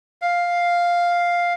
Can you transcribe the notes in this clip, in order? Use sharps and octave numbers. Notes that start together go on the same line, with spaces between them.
F5